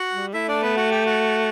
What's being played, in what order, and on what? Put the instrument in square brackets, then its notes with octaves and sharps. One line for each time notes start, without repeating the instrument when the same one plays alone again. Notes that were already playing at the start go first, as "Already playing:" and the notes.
Already playing: [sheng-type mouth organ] F#4 F#5
[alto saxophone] G3
[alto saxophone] A3 [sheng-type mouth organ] E4 E5
[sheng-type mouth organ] D4 D5
B3 B4
F#4 F#5
G4 G5
F#4 F#5